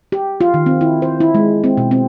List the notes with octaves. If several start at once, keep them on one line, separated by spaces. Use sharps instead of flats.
G4
F4
D#3
C4
E4
C5
E4
G#3
C4
B2
C4